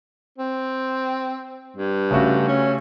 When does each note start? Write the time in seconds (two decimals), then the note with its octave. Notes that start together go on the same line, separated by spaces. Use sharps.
0.38 C4
1.77 G2
2.11 C#3 A3 F#4
2.48 C#4